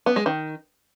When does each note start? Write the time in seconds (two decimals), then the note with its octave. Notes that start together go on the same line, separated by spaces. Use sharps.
0.06 B3
0.16 G#3
0.26 D#3